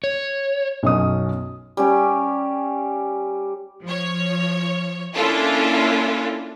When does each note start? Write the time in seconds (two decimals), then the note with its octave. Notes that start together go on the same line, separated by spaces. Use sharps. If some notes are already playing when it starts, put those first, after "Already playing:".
0.04 C#5
0.83 B1 F#2 C#4 D#6
1.77 G3 C#4 G4
3.85 F3 C#5
5.15 A#3 C#4 D4 E4 F4 A4